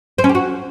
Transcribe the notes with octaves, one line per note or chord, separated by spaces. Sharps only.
C4
C#4
G4
F#4